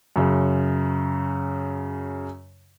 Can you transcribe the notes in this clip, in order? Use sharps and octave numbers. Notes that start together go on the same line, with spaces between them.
F#2 C#3